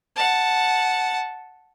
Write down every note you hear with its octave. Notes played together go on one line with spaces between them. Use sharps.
F#5 A5